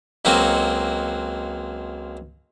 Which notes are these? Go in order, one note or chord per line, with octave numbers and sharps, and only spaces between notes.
C#2 F#3 A#3 C4 F#4 D#5